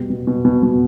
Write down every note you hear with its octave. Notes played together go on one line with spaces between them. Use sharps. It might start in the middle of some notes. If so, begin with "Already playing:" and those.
Already playing: B2 G3
B2
B2
B2
B2